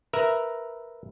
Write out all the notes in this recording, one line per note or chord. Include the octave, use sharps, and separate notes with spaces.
A#4 B4 E5 A#5